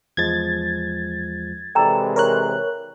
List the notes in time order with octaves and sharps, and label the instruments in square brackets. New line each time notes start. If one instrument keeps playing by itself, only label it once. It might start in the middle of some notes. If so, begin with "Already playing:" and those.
[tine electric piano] E2 F3 G#3 [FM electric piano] G#6 A6
[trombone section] C3 E3 G#3 [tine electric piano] A4 D5 [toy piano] G5 A#5 E6
[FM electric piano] A#4 C#5 F#6